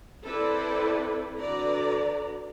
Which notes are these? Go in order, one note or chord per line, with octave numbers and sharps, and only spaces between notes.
C4 E4 A4 B4 C5 D5
D3 F#4 B4 D5 A#5